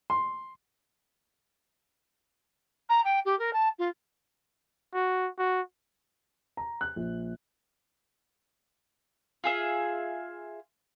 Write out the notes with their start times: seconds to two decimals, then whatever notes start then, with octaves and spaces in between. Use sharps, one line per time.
0.10 C6
2.89 A#5
3.04 G5
3.25 G4
3.39 A#4
3.53 A5
3.78 F4
4.94 F#4
5.38 F#4
6.57 A#5
6.81 F#6
6.96 A#1
9.44 F4 G#4 E5